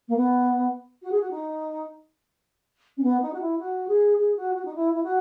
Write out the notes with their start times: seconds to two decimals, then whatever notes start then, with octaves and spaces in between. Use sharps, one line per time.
0.08 A#3
0.16 B3
1.02 F#4
1.11 G#4
1.20 F#4
1.30 D#4
2.97 C#4
3.03 B3
3.21 D#4
3.33 F#4
3.40 E4
3.59 F#4
3.88 G#4
4.17 G#4
4.36 F#4
4.55 F#4
4.65 D#4
4.75 E4
4.94 E4
5.03 F#4